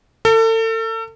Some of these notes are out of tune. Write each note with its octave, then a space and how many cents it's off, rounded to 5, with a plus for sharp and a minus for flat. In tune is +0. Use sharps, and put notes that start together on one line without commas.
A4 +35